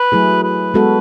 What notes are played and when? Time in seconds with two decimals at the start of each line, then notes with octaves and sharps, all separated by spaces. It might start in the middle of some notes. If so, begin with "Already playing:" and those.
Already playing: B4
0.12 F#3 A3 E4 G#4
0.43 B4
0.74 G#3 B3 F#4 A4